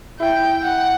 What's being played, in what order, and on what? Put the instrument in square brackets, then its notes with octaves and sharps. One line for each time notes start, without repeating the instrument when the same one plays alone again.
[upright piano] E4 [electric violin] G5
[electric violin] F#5